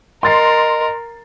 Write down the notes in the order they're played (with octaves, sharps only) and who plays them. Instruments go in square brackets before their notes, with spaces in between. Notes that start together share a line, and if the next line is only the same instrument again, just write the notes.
[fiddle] A#4 [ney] D#5 [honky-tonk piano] C6 A6 C7